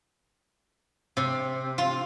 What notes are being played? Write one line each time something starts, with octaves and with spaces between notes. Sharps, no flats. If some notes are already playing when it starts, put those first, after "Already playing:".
C3
F4